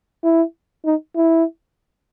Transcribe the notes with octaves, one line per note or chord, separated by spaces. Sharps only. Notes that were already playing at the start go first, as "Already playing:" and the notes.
E4
D#4
E4